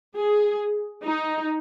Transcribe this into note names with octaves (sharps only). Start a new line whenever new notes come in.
G#4
D#4